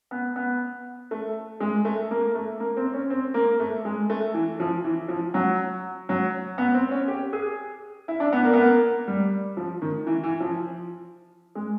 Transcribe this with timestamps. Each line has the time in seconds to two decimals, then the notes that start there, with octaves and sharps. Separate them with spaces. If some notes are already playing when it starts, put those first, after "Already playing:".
0.11 B3
0.36 B3
1.11 A3
1.60 G#3
1.85 A3
2.11 A#3
2.35 A3
2.60 A#3
2.77 C4
2.94 C#4
3.10 C4
3.34 A#3
3.60 A3
3.85 G#3
4.10 A3
4.34 E3
4.60 F3
4.84 E3
5.08 F3
5.34 F#3
6.09 F#3
6.58 B3
6.74 C4
6.91 C#4
7.08 G4
7.33 G#4
8.08 E4
8.20 D4
8.33 B3
8.45 A#3
8.53 B3
8.62 A#3
9.08 G3
9.57 F3
9.82 D#3
10.07 E3
10.23 E3
10.40 F3
11.55 G#3